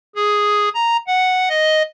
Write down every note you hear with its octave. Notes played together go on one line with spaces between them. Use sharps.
G#4
A#5
F#5
D#5